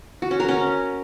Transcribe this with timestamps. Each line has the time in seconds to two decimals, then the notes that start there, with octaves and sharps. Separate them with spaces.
0.22 F#4
0.31 C#4
0.40 A#4
0.49 C#4